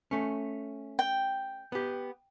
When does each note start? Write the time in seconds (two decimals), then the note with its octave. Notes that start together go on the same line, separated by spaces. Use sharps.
0.11 A3 C#4
0.99 G5
1.72 B3 G4